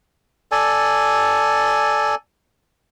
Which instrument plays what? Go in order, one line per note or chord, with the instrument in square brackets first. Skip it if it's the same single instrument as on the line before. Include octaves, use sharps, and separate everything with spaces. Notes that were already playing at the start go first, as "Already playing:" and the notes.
[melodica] A4 D5 G#5